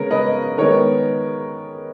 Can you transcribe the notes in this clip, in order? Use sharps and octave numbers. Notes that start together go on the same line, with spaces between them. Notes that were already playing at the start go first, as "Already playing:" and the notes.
Already playing: C#3 G#3 B3 A#4 C#5
B4 D#5
D#3 G#3 B3 A#4 C#5